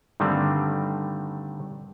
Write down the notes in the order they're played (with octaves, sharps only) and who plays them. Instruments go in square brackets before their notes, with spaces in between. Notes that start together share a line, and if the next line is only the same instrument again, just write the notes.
[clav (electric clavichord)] G2 D3 D#3 G3 A3 C4